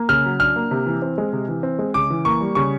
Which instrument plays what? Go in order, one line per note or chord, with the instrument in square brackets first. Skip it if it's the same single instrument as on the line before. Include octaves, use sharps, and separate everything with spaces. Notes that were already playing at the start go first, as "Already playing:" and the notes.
Already playing: [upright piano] A#3
[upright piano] C#3 [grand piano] F6
[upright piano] F#3
[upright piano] D4 [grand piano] F6
[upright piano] A#3
C3
E3
C4
G#3
C3
E3
C4
G#3
[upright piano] C#3 [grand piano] D6
[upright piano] E3
[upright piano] A#3 [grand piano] C#6
[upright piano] G3
[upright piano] C#3 [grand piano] C#6